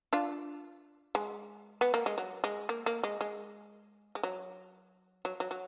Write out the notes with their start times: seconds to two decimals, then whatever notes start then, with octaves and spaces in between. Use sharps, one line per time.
0.13 D4 F4
1.15 G#3
1.81 B3
1.94 A#3
2.06 G#3
2.18 F#3
2.44 G#3
2.69 A#3
2.86 A#3
3.03 G#3
3.21 G#3
4.15 G#3
4.23 F#3
5.25 F#3
5.40 F#3
5.51 F#3